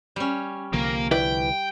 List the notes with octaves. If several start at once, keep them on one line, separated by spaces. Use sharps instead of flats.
G3 C#4
C2 D3 F3 A#3
E4 B4 D5 G5